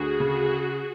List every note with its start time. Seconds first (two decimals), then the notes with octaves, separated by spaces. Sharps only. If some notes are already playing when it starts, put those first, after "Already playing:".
Already playing: D2 F#4 G#4
0.20 C#3